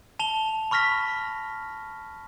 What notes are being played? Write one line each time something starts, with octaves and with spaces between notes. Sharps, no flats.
A5 F7 G7
B5 C#6 F6 A#6 B6